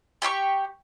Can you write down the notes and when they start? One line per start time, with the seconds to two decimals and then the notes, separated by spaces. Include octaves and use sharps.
0.22 G4 G5 B5 C#6